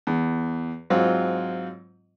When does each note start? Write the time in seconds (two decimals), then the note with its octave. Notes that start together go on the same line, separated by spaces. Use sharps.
0.07 E2
0.90 G#2 F#3 C4 F4